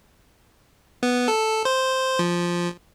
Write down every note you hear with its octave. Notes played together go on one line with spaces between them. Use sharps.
B3
A4
C5
F3